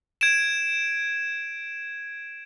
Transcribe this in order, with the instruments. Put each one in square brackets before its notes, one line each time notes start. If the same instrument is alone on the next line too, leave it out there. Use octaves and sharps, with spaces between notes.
[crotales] G#6 D7 E7